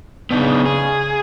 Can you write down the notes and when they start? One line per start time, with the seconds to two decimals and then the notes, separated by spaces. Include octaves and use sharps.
0.31 C#3 B3 D4 D#4
0.66 G#4